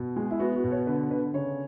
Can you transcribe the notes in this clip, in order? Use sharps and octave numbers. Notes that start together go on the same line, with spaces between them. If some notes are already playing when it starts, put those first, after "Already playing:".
Already playing: B2
G#3
E4
B3 F#4
F#4
B2
C#5
D3 B4
D3 B4
C#3 C#5